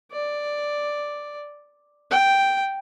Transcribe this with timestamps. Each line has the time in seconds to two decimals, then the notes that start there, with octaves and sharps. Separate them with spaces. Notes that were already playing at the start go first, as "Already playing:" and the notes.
0.12 D5
2.11 G5